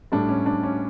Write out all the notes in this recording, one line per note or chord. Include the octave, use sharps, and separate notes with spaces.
A2 G3 D4
C#4
D4
C#4